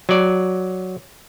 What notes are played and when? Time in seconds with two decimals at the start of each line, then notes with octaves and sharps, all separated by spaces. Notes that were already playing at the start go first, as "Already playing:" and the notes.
0.09 F#3 D5